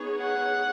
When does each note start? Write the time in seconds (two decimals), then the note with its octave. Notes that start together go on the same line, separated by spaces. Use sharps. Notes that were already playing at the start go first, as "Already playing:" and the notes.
Already playing: B3 D#4 G#4 C#5
0.20 F#5